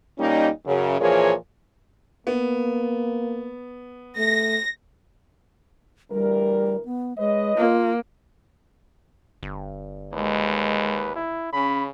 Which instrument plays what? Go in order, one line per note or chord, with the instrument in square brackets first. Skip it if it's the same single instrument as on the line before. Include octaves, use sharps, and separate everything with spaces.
[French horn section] A#2 G3 A#3 C#4 D#4
F#2 C#3
A#2 E3 F3 G#4 A#4 C#5
[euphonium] A#3 [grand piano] B3
[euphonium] A3 [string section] A#6
[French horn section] D2 E3 A#4 [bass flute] G3
[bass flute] B3
[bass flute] G#3 [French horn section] B4 C#5 D#5
[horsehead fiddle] A#3 [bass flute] F4
[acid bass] G1
[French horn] D#2 [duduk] G#3 [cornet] B4
[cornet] E4
[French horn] C#3 [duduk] C#4 [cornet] B5